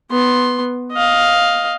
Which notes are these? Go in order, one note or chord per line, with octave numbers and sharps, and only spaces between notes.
B3 C6
D#5 F5